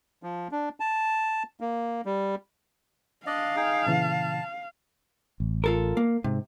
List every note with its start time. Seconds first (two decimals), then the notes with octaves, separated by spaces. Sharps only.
0.23 F3
0.51 D4
0.80 A5
1.61 A#3
2.06 G3
3.27 D4 D5 D#5 F5
3.56 D#4 G#4 G5
3.86 A#2 C#3 E3 A5
5.40 A1
5.64 F4 A4 A#4
5.97 A#3
6.24 G#2 C3